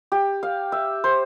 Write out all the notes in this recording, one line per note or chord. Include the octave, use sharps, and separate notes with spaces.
G4
F5
E5
C5